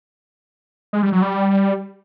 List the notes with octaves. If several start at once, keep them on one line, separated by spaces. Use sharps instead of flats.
G#3
G3
F#3
G3